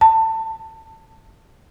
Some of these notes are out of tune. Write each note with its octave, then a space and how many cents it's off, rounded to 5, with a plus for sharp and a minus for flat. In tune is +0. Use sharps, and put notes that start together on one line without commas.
A5 +20